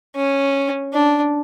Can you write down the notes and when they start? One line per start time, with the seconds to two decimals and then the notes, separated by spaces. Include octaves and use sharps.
0.15 C#4
0.93 D4